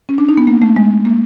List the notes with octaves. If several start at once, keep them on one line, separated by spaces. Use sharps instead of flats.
C#4
D4
D#4
B3
A#3
A3
G#3
A#3